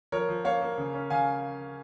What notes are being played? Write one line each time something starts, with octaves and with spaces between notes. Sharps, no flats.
F3 A#4 C#5
F3
A#3 C#5 F5
A#3
C#3
C#4
C#3 F5 G#5